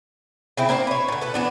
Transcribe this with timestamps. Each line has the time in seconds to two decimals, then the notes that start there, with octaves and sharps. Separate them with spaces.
0.57 C#3 C4 E4
0.69 A#3 C4 D4 C5
0.87 B4 C#5
1.08 A#2 D3
1.21 A4 B4
1.34 E3 B3 D4